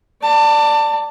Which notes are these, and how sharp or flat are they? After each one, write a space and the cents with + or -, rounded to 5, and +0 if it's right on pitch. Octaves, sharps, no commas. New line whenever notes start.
D5 +0 A5 +25